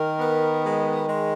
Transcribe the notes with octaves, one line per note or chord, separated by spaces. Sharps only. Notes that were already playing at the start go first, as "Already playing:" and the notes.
Already playing: D#3 A#4
B3
G#3
G#3